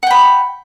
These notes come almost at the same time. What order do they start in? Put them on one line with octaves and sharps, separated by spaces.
F#5 G5 B5